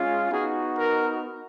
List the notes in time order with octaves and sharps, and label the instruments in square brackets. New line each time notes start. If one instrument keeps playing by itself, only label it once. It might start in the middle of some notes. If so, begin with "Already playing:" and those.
Already playing: [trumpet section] G#3 C#4 F4
B3 D#4 F#4 G#4
A#4